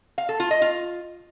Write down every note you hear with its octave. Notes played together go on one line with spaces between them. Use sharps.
F5
A4
F4
D#5
F4